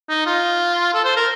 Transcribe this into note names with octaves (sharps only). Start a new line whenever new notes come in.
D#4
F4
A4
C5
A#4